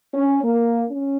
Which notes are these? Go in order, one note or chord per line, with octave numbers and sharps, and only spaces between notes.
C#4
A#3
C#4